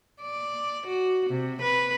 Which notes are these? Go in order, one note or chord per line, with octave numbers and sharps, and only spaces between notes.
D5
F#4
C3
B4